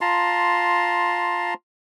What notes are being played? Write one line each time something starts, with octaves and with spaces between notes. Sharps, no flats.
F4 A5 A#5 C6